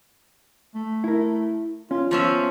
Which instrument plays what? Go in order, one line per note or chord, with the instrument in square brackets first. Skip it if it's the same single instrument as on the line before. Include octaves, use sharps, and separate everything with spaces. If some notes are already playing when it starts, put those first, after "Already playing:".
[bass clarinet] A3
[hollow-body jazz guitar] E4 A#4
[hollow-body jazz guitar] C#4 [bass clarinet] F4
[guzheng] F3 C#4 E5 [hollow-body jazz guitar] B3 [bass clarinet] F4